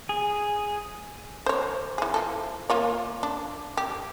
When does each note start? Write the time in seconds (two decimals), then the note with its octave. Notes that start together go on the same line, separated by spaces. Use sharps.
0.09 G#4
1.46 C5 C#5
1.98 E3 G#4
2.14 F3 A4
2.70 A#3 F4 C#5
3.23 D4
3.77 G4